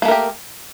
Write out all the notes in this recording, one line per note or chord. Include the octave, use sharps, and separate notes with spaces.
A3 A#3 G4 A#4